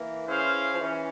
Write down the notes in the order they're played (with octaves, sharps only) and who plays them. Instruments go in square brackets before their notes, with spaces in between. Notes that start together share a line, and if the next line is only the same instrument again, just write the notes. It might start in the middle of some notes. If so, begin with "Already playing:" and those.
Already playing: [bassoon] E3 [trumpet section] A#3
[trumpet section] C#4 E4 G#4 C5 F5
[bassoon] F3
[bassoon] E3 [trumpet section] C#4